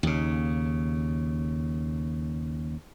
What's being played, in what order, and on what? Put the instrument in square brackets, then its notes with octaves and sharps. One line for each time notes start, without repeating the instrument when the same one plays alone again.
[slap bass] D#2 C#3